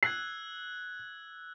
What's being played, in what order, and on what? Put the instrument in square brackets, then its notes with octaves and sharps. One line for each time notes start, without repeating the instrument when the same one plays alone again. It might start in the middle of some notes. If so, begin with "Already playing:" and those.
[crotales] E6 F#6 G#6 [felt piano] C7